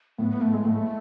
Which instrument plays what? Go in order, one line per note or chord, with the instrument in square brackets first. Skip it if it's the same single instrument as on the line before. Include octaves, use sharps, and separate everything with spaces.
[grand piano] A2 [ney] B3
[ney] B3
[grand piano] A2 [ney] A3
[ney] G#3
[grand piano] A2 [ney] A3